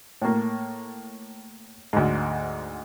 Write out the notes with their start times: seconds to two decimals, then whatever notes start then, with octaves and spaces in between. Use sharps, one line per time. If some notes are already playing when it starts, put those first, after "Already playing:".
0.22 A2 A#3
1.93 D2 G#2